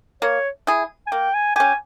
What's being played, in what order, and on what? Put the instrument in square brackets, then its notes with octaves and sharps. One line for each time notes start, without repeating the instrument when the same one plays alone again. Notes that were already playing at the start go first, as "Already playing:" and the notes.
[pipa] A#3 [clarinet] C#5
[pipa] E4 G#4
[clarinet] G#5
[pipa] A#3 [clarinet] G5
[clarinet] G#5
[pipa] C#4 G4 [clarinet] G#5